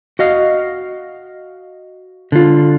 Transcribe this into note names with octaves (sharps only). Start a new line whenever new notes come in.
F#4 D#5 F5
D3 F4